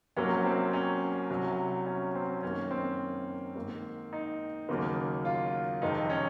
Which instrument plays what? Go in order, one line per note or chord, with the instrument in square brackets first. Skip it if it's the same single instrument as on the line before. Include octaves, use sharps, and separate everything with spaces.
[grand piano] C2 C3 F#3 A#3 C#4
C4
C#4
C2 C3 F#3
C#4
C4
F#2 D#3 A#3 C#4
C4
G#2 D#3 A#3
D#4
D#2 C#3 F#3 A#3
F4
F2 C3 D#3 G#3 D#4
C#4